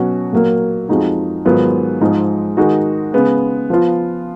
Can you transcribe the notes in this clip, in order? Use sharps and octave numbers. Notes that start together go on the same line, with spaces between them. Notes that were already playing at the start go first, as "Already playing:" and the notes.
Already playing: B2 F#3 C#4 F#4
A#2 F#3 A#3
F2 F3 G#3 D#4 F#4
G#2 D#3 F#3 B3 F4
G#2 F3 G#3 D#4
D#3 G#3 D#4 F#4
C#3 G#3 B3
F3 B3 F4